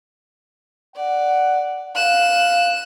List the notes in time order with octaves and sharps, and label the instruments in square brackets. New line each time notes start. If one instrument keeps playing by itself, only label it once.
[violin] D5 [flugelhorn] F#5
[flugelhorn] F5 [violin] F#6 E7